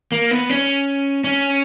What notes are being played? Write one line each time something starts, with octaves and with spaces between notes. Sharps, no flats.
A#3
B3
C#4
C#4